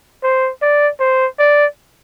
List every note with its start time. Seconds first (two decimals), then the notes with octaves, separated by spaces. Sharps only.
0.23 C5
0.62 D5
1.00 C5
1.39 D5